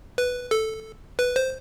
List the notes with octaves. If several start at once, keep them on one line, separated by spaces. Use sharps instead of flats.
B4
A4
B4
C5